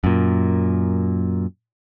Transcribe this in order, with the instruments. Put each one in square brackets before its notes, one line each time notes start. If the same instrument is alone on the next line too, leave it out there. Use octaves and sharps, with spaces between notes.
[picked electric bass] F#2 A#2